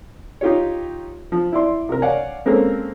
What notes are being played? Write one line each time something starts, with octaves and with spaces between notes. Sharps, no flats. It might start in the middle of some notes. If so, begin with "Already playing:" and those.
D#4 F4 G4 C#5
F3
E4 D5 C6
C3 A#4
C#5 D5 F5 F#5 G#5
G#3 A#3 C4 C#4 A4 A#4